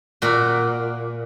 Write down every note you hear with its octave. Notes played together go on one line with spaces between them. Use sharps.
A#2 F#4